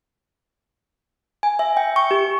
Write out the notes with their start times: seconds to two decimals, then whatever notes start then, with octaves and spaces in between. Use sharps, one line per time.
1.43 G#5
1.59 E5
1.77 G5
1.96 C#6
2.11 G4